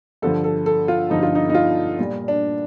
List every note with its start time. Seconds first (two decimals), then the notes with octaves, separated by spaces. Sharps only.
0.22 G2 D3 F3 A4
0.44 A4
0.66 A4
0.88 F4
1.10 G2 D3 F3 D#4
1.23 F4
1.35 D#4
1.50 D#4
1.55 F4
1.98 A#2 G3
2.28 D4